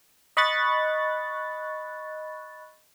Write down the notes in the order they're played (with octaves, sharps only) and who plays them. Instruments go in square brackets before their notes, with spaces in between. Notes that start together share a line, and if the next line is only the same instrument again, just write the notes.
[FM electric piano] D#5 B5 C#6 F#6 A6